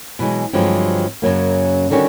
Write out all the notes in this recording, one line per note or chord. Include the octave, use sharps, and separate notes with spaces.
B2 E3 F#3 G#3
G2 D3 F3 F#3 G#3 C4
F#2 C#3 F#3 A#3
D3 D#3 G3 C#4 F#4